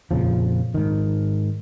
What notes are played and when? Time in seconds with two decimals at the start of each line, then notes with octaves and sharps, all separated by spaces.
0.11 F2 A#2 C#3 F3
0.74 G#2 D#3